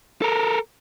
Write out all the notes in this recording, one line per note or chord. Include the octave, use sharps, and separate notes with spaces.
A4 A#4